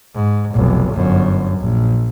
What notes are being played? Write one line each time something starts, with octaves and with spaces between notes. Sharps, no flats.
G#2
F1 B1
G1 F#2
A#1